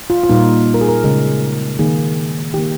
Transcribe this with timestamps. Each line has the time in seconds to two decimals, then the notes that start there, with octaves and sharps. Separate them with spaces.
0.10 F4
0.24 F4
0.29 A#2 G3 A#3 D#4
0.74 A#4
0.81 G#4
0.89 A#4
1.04 C#3 G#3 A#4
1.79 D#3 A#3 G#4
2.54 D#3 A#3 G4